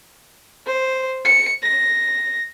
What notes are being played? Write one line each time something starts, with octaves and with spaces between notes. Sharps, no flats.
C5
C#7
A#6